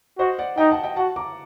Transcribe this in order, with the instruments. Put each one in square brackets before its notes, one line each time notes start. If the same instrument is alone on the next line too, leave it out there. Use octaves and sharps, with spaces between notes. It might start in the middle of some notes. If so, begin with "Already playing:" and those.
[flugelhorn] F#4 [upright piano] C5 D#5
[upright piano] D5 F#5
[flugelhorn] D#4 [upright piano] D#5 G5
[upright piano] F#5 A5
D#5 G5
[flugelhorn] F#4 [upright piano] F#5 A5
[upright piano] A#5 D6